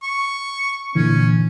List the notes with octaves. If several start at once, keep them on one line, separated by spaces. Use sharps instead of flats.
C#6
A#2 D3 E3 C#4